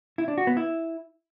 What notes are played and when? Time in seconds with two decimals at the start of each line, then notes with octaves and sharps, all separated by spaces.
0.18 E4
0.28 D4
0.38 F#4
0.47 B3
0.57 E4